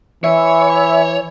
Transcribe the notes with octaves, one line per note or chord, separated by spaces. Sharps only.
E3 C#5 E5